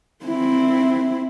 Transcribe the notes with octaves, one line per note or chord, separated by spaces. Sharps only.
C4 E4